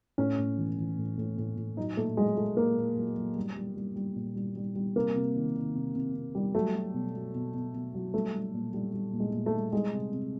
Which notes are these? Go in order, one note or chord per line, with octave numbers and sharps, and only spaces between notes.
A2 C#4
A2
E3
E3
A2
A2
A2
A2
F#3 D#4
A#2 A3
F#3 G#3
F#3 A3
A#2 A#3
A#2
F#3
F#3
G3
G3
G3
G3
A#2
G3
G3
G3
C3 A#3
C3
D#3
D#3
C3
C3
C3
G3
F#3 A3
F#3
B2
F#3
B2
B2
B2
F#3
G3 A3
G3
A#2
G3
G3
A#2
G#3
A#2
A3
G3
G3 G#3
C3
C3